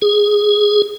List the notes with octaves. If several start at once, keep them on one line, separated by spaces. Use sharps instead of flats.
G#4